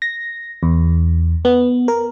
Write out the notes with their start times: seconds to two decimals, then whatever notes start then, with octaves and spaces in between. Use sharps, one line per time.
0.02 A#6
0.63 E2
1.45 B3
1.88 A#4